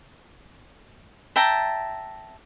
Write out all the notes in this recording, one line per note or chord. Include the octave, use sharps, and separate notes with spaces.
E5 G5 A5 A#5